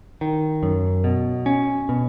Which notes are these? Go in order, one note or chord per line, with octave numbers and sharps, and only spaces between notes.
D#3
F#2
B2
C#4
B2